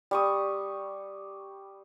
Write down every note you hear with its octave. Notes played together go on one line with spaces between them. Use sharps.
G3 C#6 D#6